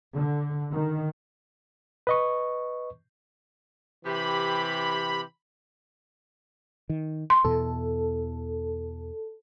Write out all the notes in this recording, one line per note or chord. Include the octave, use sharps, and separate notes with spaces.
D3
D#3
B4 D#5 C#6
C3 E3 G4 B5
D#3
C6
E2 B2 E3 A4